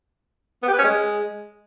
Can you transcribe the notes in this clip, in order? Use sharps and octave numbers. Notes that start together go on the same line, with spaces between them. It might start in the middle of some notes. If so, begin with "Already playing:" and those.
B3
G4
B4
C#4
G#3